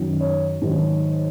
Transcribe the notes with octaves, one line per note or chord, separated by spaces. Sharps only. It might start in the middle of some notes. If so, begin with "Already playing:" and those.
Already playing: F#2 D#3 F#3
C#5
G#2 D#3 F#3